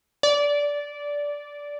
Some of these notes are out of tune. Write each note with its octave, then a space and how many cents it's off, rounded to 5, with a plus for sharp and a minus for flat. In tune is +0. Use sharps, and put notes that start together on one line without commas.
D5 -15